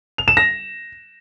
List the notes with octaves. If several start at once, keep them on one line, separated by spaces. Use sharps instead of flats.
F7
E7
A#6